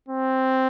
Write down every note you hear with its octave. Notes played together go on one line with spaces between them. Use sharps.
C4